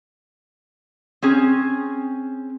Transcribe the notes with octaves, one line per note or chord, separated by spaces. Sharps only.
C4 C#4 G#4